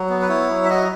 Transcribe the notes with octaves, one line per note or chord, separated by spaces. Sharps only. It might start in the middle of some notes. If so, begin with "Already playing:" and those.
Already playing: F#3
B3
B4
E4 C#5
F#3
E5
F#4 D#5